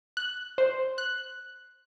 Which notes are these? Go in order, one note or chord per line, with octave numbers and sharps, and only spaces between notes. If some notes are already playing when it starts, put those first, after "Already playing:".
F#6
C5
F#6